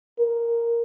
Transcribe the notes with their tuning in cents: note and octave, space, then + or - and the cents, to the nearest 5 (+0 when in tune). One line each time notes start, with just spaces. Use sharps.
A#4 +0